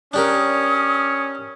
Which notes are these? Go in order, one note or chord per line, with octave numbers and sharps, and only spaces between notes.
C#4 D4 G4 A#4 D#6